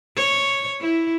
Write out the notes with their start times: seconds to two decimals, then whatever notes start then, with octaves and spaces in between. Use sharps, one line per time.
0.16 C#5
0.81 E4